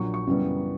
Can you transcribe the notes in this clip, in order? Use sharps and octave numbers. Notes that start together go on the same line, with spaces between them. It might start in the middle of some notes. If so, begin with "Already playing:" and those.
Already playing: A#1 A#2 F#3 C#6
C#6
F#2 C#3 E3 G3 B3